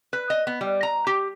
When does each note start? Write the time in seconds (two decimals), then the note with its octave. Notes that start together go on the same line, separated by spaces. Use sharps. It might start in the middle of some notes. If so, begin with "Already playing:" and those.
0.13 B4
0.30 D#5
0.47 B3
0.61 G3
0.83 A#5
1.07 G4